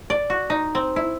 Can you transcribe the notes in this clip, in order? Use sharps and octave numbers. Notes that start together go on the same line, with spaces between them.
D5
F#4
D#4
C4
E4